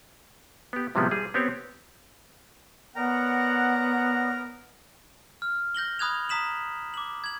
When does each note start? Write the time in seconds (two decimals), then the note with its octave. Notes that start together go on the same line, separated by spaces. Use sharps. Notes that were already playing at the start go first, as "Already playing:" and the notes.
0.73 B3 G4
0.95 A2 C3 F3 G3 G#3 B3
1.11 G3 G#4
1.34 B3 C4 G4 C#5
2.96 B3 A#4 C#5 D5 F#5 A#5
5.42 F6
5.75 G6 A#6 F#7 G7
5.99 B5 D#6 F#6 G#6 F7
6.29 A#5 D#6 B6 E7 F#7
6.94 D6 F#7
7.24 G#6 F#7